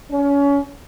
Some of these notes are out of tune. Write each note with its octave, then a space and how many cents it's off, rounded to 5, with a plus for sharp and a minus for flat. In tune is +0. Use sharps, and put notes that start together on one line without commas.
C#4 +30